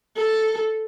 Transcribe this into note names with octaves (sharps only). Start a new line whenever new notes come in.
A4